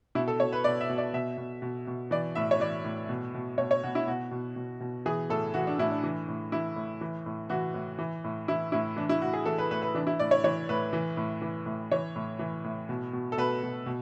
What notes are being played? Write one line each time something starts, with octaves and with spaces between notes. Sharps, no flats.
B2 E4
A4
B2 C#5
B4
B2 D5
E5
B2
D5
B2 E5
B2
B2
B2
E3 D5
A2 E5
C#5
E3 D5
A2
B2
B2
B2 C#5
C#5
B2 F#4
E4
B2 F#4
B2
B2
B2
E3 G#4
A2 A4
E3 F#4
D4
A2 E4
D4
E3
A2
E3 E4
A2
E3
A2
E3 F#4
A2
E3
A2
E3 E4
A2 E4
E3 D4
E4
A2 F#4
G#4
E3 A4
B4
A2 B4
B4
E3 D4
E4
A2 D5
C#5
E3 C#5
A2 B4
E3
A2
E3
A2
E3 C#5
A2
E3
A2
B2
B2
A4
B2 B4
B2
B2